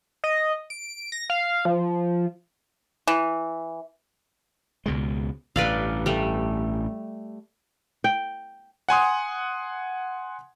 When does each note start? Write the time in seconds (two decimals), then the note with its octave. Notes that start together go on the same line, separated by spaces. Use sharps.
0.24 D#5
0.70 D7
1.12 A#6
1.30 F5
1.65 F3
3.07 E3
4.86 C#2 B2 G#3
5.56 A1 G2 B4 D5 F5
6.06 G3 A3
8.04 G5
8.89 F#5 G#5 C6 D#6